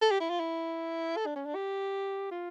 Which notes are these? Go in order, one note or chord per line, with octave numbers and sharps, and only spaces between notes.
A4
G4
E4
F4
E4
A4
D4
C#4
D4
G4
F4